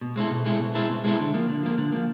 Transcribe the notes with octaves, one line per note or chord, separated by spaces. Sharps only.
B2
G#3 C4 E4 A4
B2
G#3 C4 E4 A4
B2
G#3 C4 E4 A4
B2
G#3 C4 E4 A4
D3
F3 A#3
D3
F3 A#3
D3
F3 A#3